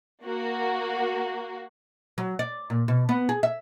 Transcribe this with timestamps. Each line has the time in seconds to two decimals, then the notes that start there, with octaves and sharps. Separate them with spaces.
0.24 A#3 F#4
2.18 F#3
2.39 D5
2.70 A#2
2.88 B2
3.09 B3
3.29 G#4
3.43 E5